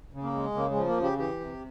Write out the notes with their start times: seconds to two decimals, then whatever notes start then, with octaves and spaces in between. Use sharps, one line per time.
0.13 C#3
0.23 A#3
0.34 G#3
0.55 C#3 A#3
0.70 G#3
0.76 F3
0.87 A#3
0.97 C#3
1.03 G4
1.18 E3 G4
1.40 C3